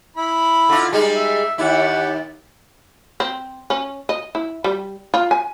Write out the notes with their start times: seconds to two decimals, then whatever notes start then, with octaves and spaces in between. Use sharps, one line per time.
0.17 E4 B5
0.69 D3 F4
0.93 G3 G#3 D#4
1.15 E5
1.58 D#2 E4 G4 F#5
3.20 C4
3.70 C#4
4.09 D#5
4.35 E4
4.64 G3
5.14 F4
5.31 G#5